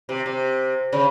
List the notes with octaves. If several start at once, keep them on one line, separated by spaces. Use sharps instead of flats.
C3
C3
C#3